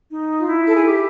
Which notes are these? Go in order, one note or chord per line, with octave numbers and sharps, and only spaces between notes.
D#4
F4
E4
A4
G#4
G4